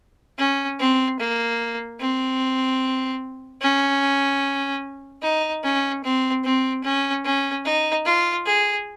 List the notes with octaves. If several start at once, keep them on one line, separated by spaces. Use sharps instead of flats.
C#4
C4
A#3
C4
C#4
D#4
C#4
C4
C4
C#4
C#4
D#4
F4
G#4